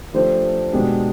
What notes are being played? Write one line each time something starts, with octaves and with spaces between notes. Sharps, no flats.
F3 A3 D4 G4 C5
B2 G#3 B3 D4 G4